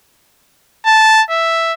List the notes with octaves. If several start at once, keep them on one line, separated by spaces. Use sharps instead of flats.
A5
E5